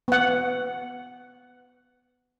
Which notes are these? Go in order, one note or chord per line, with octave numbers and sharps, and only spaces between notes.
B3 F#5